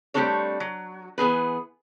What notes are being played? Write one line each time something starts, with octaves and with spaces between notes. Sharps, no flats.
G3 A3 C4 D4 A4 C#5
F#3
E3 B3 G#4 B4